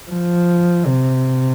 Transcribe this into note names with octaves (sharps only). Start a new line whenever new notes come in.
F3
C3